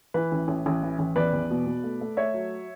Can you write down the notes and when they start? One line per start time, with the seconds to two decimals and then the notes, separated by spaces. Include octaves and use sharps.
0.14 E3 B4
0.32 A1
0.48 A1
0.66 A1
0.83 E3
0.99 A1
1.16 E2 B4 D5
1.33 E2
1.51 B2
1.66 B2
1.84 A3
2.01 A3
2.17 A3 C#5 E5
2.34 F#3